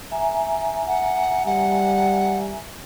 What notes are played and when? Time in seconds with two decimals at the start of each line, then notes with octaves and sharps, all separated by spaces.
0.11 E5 G#5 A#5
0.87 F#5
1.46 G3 F#5